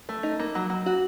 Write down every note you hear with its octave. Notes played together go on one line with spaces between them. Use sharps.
A3
D#4
A#3
F#3
F#3
F#4